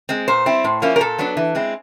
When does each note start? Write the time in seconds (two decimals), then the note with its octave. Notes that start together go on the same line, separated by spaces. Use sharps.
0.09 G#3 C4
0.28 A#2 C5
0.46 G3 C4 E4
0.64 A2
0.82 F3 A#3 C#4 E4
0.96 A#4
1.01 A#2 A4
1.19 F#3 B3 D4
1.37 E3
1.55 G#3 C4 E4